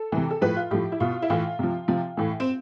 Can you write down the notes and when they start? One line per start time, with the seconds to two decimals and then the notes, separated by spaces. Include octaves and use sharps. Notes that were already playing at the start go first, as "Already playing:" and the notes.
Already playing: A4
0.12 C3 E3
0.30 A4
0.41 A2 F3 B4
0.57 F4
0.71 A2 F3 G4
0.92 E4
1.00 B2 F4
1.22 E4
1.30 A2 E3 F4
1.59 C3 F3
1.88 C3 F3
2.17 A2 E3
2.40 C4